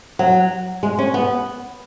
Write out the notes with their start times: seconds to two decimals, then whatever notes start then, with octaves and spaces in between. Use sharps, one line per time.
0.19 F#3
0.83 G#3
0.99 C#4
1.14 B3